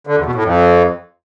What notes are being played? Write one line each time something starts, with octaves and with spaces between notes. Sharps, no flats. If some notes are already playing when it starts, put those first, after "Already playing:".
D3
E2
B2
A2
F2